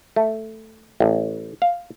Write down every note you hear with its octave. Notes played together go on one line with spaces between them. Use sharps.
A3
A1
F5